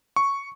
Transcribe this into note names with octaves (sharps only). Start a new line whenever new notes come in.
C#6